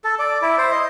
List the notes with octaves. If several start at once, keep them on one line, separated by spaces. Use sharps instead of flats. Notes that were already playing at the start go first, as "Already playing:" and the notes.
A4
D5
E4
C5
D#5